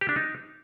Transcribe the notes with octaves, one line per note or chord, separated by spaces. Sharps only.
G4
D4
D#4